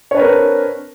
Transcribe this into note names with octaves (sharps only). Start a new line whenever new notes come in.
C4 D4 A#4 B4 C#5